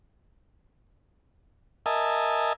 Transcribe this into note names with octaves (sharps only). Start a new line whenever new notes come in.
A#4 D#5 E5 G#5 A5